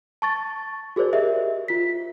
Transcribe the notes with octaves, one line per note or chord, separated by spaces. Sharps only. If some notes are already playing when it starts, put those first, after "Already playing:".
A5 C#6 A6
F#4 G#4 A#4 C5 D5
G4 A#4 D#5 E5
F4 B6